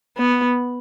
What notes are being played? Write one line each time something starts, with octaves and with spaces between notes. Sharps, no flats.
B3